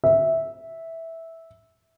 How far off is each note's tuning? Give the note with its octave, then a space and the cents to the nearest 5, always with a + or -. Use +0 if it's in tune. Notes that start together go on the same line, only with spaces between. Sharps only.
E5 -10